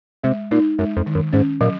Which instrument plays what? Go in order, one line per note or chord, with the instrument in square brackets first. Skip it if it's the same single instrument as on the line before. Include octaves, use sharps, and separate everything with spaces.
[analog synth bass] C3 [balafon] G#3
[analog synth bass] A#2 [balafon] D#4
[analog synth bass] F#2 [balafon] G#3
[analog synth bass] F2
[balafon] D#3
[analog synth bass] F#2
[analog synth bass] G#2 [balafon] C#4
[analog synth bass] A#2 [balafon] F#3